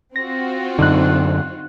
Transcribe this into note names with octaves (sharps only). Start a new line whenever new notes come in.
C4 F4 F#4 A#6
F#2 D3 D#4 F#6